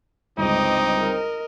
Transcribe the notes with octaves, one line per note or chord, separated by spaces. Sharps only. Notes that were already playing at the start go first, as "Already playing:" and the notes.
G1 C#2 C4 D#4 D#5 D6
A#4 D#5